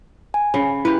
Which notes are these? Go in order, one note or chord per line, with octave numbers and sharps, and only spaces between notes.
G#5
C#3 B5
E4 G4 B4